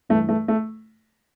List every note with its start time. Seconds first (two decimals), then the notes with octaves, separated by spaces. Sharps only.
0.09 G2 E3 A3
0.29 A3
0.48 A3